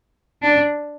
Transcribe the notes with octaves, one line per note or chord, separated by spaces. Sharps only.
D4